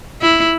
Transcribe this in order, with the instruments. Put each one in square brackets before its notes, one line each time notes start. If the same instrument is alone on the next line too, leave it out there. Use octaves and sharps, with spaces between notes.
[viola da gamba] E4